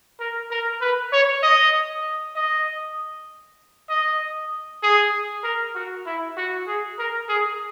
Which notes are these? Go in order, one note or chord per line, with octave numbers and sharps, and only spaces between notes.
A#4
A#4
B4
C#5
D#5
D#5
D#5
G#4
A#4
F#4
E4
F#4
G#4
A#4
G#4